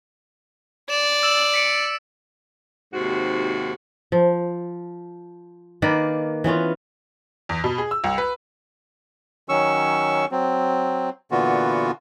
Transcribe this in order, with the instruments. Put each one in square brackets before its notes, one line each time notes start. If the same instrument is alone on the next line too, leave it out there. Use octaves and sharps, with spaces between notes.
[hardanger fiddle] D5 [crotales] E7
[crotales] E6 A6 E7
B6 C#7 D7
[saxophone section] D#2 G#2 C3 F#4
[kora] F3
D#3 A#3 B4 D5
E3 B3 C#4 F4
[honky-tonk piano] E2
B2
G#4
E6
C2
B4
[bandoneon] D#3 F#3 C#4 C#6 E6
F#3 C4
A#2 D3 E3 B3 F4 F#4